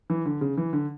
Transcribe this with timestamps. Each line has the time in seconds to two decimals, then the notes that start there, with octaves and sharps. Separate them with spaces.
0.10 E3
0.26 D3
0.41 C#3
0.57 E3
0.73 D3